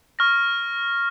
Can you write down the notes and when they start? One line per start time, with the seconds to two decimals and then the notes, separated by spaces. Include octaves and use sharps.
0.19 C#6 F6 A#6